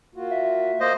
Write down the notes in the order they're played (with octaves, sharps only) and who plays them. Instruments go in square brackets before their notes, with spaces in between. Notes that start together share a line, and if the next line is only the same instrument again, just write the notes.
[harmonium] A#3 F4 F#4
[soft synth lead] E5
[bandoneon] A#3 C5 D#5